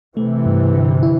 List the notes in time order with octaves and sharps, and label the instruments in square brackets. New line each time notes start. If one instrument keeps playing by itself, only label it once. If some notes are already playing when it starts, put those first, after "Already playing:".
[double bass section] C3 E3 [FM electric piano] A3
[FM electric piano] G2
D3
E4